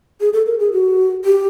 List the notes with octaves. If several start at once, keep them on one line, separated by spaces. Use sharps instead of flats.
G#4
A4
A#4
G#4
F#4
G4